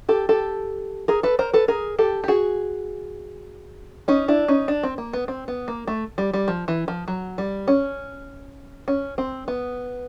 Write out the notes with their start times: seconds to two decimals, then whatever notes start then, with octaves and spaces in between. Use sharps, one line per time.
0.09 G4 A4
0.29 G4 A4
1.08 G#4 A#4
1.23 A4 B4
1.39 A#4 C5
1.53 A4 B4
1.68 G#4 A#4
1.99 G4 A4
2.24 G4
2.28 F#4 G#4
4.08 C#4 D#4
4.28 D4 E4
4.48 C#4 D#4
4.68 D4
4.83 C4
4.98 A#3
5.13 B3
5.28 C4
5.48 B3
5.68 A#3
5.88 A3
6.18 G3
6.33 G3
6.48 F3
6.68 E3
6.88 F3
7.08 F#3
7.38 G3
7.68 C#4
8.88 C#4
9.18 C4
9.48 B3